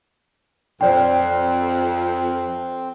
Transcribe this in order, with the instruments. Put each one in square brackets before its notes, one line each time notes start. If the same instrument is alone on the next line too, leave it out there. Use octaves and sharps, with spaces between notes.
[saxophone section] F2 [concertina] C4 [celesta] C5 D5 G5